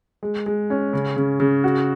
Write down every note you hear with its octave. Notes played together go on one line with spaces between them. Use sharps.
G#3
G#3
C#4
C#3
C#3
C#3
F#4